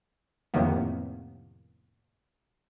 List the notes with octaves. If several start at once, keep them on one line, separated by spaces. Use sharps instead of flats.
F2 A2 C3 D#3 A#3 B3